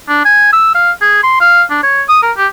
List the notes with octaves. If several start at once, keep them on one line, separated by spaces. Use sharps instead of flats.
D4
G#5
E6
F5
G#4
C6
F5
D4
C#5
D#6
A#4
G4